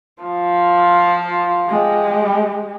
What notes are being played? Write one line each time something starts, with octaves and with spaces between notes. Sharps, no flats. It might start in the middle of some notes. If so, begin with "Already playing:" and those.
F3 F4
G#3 G4